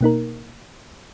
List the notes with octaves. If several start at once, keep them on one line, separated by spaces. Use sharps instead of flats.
B2 A#3 D#4 A#4